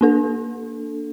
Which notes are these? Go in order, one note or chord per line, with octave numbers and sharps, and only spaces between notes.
A#3 D4 A4